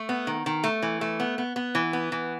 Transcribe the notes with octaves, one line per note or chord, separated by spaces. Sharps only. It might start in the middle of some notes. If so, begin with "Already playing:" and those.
Already playing: A3
B3
D#3
D#3
A3
E3
A3
B3
B3
B3
E3
B3
E3